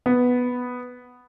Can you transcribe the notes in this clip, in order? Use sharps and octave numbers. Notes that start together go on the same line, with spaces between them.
B3